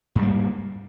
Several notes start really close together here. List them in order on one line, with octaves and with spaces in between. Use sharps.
G#2 G3 A#3